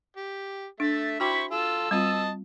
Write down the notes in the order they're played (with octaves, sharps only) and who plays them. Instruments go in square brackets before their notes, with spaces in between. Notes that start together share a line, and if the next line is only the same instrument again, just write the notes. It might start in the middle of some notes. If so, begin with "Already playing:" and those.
[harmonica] G4
[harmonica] A3 E5 [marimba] D4 [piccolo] A6
[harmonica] E4 C5 B5 [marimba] F#4 G5 D6 [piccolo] C#6
[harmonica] F4 A4 [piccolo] E6
[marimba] G3 C4 F4 [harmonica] D#5 A5 D#6